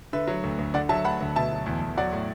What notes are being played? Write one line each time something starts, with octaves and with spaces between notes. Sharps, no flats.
D3 B4 E5
F#3
D2
D2
D3 D5 F#5
F#3 E5 A5
D2 F#5 B5
D2
B2 E5 A5
F#3
E2
E2
F#3 D5 F#5
A2